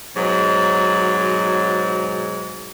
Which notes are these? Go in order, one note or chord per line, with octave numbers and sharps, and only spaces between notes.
G#2 B2 F#3